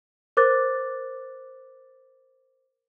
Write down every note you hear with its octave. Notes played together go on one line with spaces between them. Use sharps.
A#4 C5 D6 F#6 A6